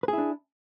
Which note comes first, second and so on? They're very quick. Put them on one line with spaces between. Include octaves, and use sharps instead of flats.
B4 G#4 E4 D4